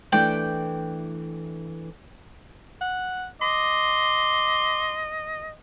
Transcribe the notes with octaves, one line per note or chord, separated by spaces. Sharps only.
E3 A3 D4 D5 G5
F#5
D#5 C6 D6